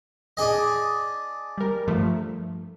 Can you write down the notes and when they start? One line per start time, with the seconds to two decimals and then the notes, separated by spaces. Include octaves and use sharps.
0.37 D4 G#4 D#5
1.58 G3 A#4
1.87 G2 F3 A3